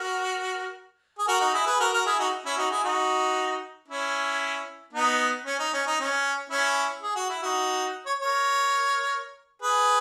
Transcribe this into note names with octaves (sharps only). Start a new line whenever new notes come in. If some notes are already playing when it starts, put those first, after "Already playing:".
Already playing: F#4 A#4
G#4
F#4 A#4
D#4 F#4
E4 G#4
G#4 B4
F#4 A#4
F#4 A#4
E4 G#4
D#4 F#4
C#4 E4
D#4 F#4
E4 G#4
D#4 F#4
C#4 E4
B3 D#4
C#4
D#4
C#4
D#4
C#4
C#4 E4
G#4
F#4
E4
D#4 F#4
C#5
A#4 C#5
G#4 B4